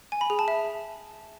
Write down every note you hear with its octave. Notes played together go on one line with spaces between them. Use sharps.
G#5
B5
G#4
A5
E5